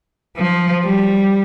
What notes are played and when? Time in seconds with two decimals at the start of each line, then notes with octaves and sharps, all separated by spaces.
0.37 F3
0.84 G3